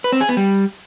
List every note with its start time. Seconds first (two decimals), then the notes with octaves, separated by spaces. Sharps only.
0.04 B4
0.12 C4
0.21 G#4
0.29 B3
0.37 G3